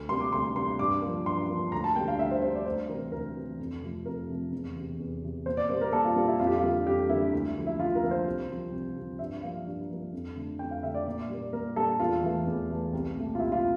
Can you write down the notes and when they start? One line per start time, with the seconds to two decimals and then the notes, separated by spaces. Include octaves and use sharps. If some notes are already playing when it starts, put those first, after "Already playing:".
Already playing: D2
0.09 C3 G3 A#3 C6
0.20 D6
0.32 D2 C6
0.55 C3 G3 A#3 C6
0.79 G2 D6
1.02 F3 A#3
1.26 G2 C6
1.49 F3 A#3
1.72 D2 A#5
1.84 A5
1.96 D3 G3 A#3 G5
2.08 F5
2.19 D2 E5
2.31 C5
2.42 D3 G3 A#3 C5
2.55 D5
2.66 D2 C5
2.89 E3 A#4
2.93 C3
3.12 D2 A#4
3.35 C3 E3
3.59 F2
3.83 C3 F3 A3
4.05 F2 A#4
4.30 C3 F3 A3
4.52 E2
4.76 C3 E3
5.00 E2
5.23 C3 E3
5.46 A#2 C5
5.57 D5
5.69 G3 A#3 C5
5.81 A#4
5.93 A#2 A4
6.04 F4
6.16 G3 A#3 F4
6.28 E4
6.40 F2 F4
6.47 G4
6.56 F4
6.62 D3 G3 A#3
6.86 F2 G4
7.09 D3 G3 A#3 E4
7.32 D2
7.57 D3 F3 A#3
7.67 E4
7.79 D2 F4
7.95 A#4
8.03 D3 F3 A#3
8.11 C5
8.26 C2
8.49 C3 F3
8.72 C2
8.96 C3 F3
9.19 G2 E5
9.43 F3 A#3 F5
9.66 G2
9.90 F3 A#3
10.13 F2
10.36 D3 A3
10.59 F2 G5
10.71 F5
10.82 D3 E5
10.86 A3
10.94 D5
11.07 A#2 D5
11.30 G3 A#3
11.53 A#2 A#4
11.76 G3 A#3 A4
12.00 E2 F4
12.23 E3 A3
12.47 E2
12.70 E3 A3
12.93 C2
13.16 A#2 A3
13.35 F4
13.39 C2 E4
13.52 F4